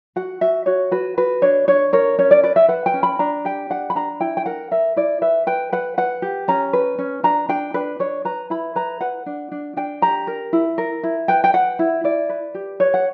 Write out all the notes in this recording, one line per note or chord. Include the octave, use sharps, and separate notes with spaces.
F#4 F#5
F#4 E5
F#4 C#5
F#4 B4
F#4 B4
D4 C#5
D4 C#5
A#4 C#5
C#4 C#5
D5
B4 D5
E5
B4 F#5
G5
C#4
B5
D4 A#5
G4 G5
D4 F#5
B5
D4 A#5
E4 G5
G5
A#4 F#5
A#4 E5
E4 D5
B4 E5
B4 G5
B4 F#5
B4 F#5
G4
C#4 A#5
B4
C#4
D4 A#5
D4 G5
D4 B4
D4 C#5
B4 A#5
E4 B5
B4 A#5
B4 F#5
D4
D4
D4 G5
G4 A#5
A#4
E4
A#4
E4
B4 G5
G5
B4 F#5
E4
E4 D5
B4
G4
B4 C#5
F#5